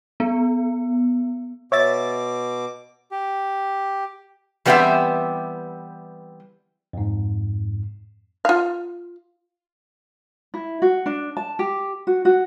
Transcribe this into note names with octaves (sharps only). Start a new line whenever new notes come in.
B3
B2 C#5 E5 D6 A6
G4
E3 G3 B3 C4 G4 E5
F2 G#2
F4 F5
E4
F#4
D4
A5
G4
F#4
F#4